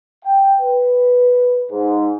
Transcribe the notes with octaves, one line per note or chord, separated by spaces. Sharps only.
G5
B4
G#2